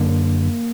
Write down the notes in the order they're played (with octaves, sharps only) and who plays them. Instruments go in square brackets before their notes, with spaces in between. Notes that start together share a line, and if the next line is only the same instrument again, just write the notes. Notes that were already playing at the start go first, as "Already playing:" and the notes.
Already playing: [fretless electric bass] F#2 D3 A#3